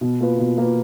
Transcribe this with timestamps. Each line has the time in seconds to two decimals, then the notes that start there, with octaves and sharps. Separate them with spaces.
0.01 B2
0.20 A#3 F4 B4
0.39 B2
0.58 A#3 F4 B4